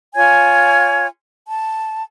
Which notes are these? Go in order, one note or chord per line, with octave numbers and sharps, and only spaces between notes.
F4 C#5 G#5 G#6
A5